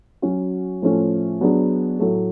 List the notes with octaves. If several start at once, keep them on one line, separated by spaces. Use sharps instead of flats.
F#3 C#4 F#4
A2 F3 A3 C#4
F#3 B3 D4 G#4
A2 F#3 A3